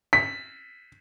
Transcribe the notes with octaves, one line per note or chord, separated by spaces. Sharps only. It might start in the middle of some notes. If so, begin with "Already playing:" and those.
B6